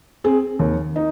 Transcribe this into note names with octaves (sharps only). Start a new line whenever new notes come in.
C4 G#4
D#2
D#4